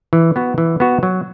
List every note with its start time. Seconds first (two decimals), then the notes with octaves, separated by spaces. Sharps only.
0.13 E3
0.36 B3 F#4
0.58 E3
0.80 B3 F#4
1.03 F#3